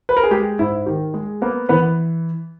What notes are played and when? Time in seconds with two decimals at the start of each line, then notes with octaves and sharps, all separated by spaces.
0.09 B4
0.17 A#4
0.23 G#4
0.31 G#3 G4
0.59 G#2 E4
0.86 D#3 G4
1.14 G#3 G#4
1.41 A#3 B3 A#4
1.69 E3 B3 B4